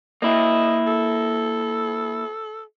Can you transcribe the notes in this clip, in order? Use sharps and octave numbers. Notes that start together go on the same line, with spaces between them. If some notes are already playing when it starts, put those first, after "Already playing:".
A#3 E4 D#5
A4